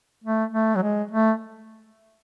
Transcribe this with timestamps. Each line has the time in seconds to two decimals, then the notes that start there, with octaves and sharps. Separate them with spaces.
0.24 A3
0.53 A3
0.76 F#3
0.83 G#3
1.11 A3